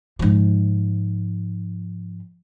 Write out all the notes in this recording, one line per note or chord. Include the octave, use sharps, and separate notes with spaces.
G#2 F3